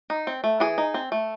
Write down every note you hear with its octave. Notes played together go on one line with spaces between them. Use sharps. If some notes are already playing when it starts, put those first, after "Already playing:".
D#4
C4
A3
E3 G#4
D#4
C4
A3